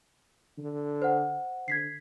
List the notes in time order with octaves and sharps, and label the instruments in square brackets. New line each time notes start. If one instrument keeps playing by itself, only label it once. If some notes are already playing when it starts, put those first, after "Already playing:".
[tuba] D3
[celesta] C5 F#5
[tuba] D3 [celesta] G#6 B6 C7